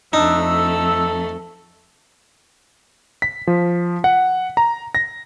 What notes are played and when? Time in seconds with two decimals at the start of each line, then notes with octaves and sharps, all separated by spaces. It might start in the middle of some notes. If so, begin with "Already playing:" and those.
0.13 F2 A3 D4 D#4 E6
0.54 A4
3.22 B6
3.47 F3
4.04 F#5
4.57 A#5
4.95 A#6